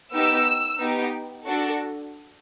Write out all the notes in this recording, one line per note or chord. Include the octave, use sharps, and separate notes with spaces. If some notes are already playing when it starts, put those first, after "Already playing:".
B3 D#4 G4 E6
B3 D#4 G4
D4 F#4 A4